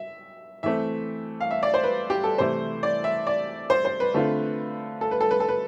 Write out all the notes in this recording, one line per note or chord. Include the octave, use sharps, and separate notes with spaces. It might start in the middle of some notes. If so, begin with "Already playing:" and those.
Already playing: E5
E3 A3 C4 E5
F5
E5
D5
C5
B4
G4
A4
C3 E3 A3 E4 C5
D5
E5
D5
C5
C5
B4
D3 A3 C4 F4
A4
B4
A4
B4
A4
B4